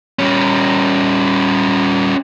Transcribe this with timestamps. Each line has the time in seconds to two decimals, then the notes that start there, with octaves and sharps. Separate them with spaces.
0.19 G3 C#4